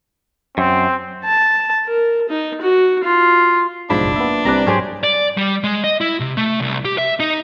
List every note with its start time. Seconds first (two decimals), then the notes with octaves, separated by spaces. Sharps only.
0.58 F#2 C4
1.25 A5
1.86 A#4
2.29 D#4
2.61 F#4
3.04 F4
3.90 B1 G#2 F3 D4 E4 B5
4.03 F#1
4.16 A#3 B3 E5
4.45 C2 C3 B4 D5 A#5
4.67 G#2 F#3 G4 G#4 C5 C#5
5.04 D5
5.37 G3
5.64 G#3
5.84 D#5
6.01 E4
6.20 C3
6.37 A3
6.60 C2
6.85 G4
6.98 E5
7.20 D#4